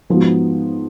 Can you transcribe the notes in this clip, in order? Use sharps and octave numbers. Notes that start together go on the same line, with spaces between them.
G#2 F3 B3 D#4 F#4